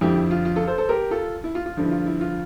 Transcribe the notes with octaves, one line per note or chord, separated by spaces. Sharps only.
F2 D3 F3 E4 G4
E4
F4
F4
F4 A4
A4 C5
A4 C5
G4 A#4
F4 A4
E4
F4
F4
G2 D3 F3
E4
F4
E4
F4